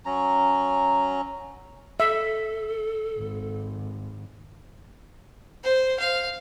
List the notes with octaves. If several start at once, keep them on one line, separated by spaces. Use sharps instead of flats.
F#3 C#4 A#5
A4 E5
G#1
C5
F5